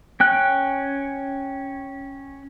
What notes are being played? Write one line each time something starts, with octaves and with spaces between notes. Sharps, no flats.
C#4 G5 F#6